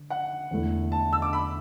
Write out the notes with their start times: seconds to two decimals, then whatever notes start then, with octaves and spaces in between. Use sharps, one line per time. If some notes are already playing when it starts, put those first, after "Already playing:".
Already playing: D3
0.10 F#5
0.51 E2 D3 A3 E4 A4
0.92 A5
1.13 E6
1.22 D6
1.33 B5